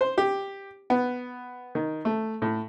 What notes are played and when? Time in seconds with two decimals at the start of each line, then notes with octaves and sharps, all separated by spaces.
0.01 C5
0.18 G4
0.90 B3
1.75 D#3
2.05 A3
2.42 A2